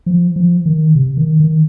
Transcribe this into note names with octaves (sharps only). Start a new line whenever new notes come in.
F3
F3
D#3
C3
D#3
D#3